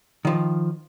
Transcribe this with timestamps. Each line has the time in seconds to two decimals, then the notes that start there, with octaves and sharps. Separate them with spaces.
0.25 D#3 F3